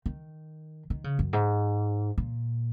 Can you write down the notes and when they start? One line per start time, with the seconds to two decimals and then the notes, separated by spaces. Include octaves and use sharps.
0.06 D#3
0.90 D#3
1.04 C#3
1.19 F#2
1.33 G#2
2.18 A#2